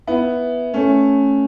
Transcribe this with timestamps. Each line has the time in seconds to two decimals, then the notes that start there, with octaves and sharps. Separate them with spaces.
0.07 B3 E4
0.74 A3 C#4